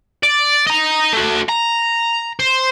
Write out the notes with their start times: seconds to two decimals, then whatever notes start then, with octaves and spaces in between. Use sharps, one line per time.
0.23 D5
0.67 D#5 A#5
1.13 A3 F#4
1.49 A#5
2.39 C5